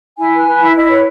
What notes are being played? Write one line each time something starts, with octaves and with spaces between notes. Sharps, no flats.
E4 G#5
B4
B4
E4
E4 D#5
B4 C#5